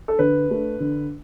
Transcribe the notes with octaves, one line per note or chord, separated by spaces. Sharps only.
A4
D3 B4
A3 D4
D3